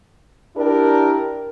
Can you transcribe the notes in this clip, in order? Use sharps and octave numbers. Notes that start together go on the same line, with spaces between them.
D4 E4 G4 A#4